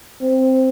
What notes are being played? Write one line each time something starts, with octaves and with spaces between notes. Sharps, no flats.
C4